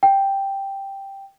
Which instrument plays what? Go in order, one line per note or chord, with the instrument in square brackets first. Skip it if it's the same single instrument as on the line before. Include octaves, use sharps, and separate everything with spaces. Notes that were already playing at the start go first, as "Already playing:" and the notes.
[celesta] G5